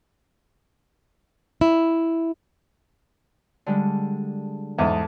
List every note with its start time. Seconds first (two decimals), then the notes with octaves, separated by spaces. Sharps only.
1.61 E4
3.66 D3 G3 G#3
4.78 E2 G#2 A4 D#5